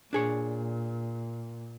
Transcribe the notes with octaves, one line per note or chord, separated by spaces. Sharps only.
A#2 D4 G#4 C#5